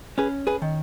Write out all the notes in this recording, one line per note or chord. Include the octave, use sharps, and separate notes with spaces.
C#4 G#4 B4
G#4 B4
D#3